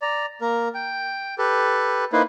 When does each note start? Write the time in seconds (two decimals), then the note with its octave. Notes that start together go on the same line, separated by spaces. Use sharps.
0.02 D5 A#5
0.41 A#3 A#4
0.75 G5
1.38 G4 A4 B4
2.13 A#3 D#4 E4 B4 C5